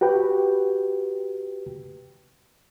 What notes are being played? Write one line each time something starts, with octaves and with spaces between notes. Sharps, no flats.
F#4 G4 B4 G5